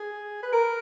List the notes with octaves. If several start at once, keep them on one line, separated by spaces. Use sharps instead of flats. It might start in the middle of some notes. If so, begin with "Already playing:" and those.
Already playing: G#4
B4
A#4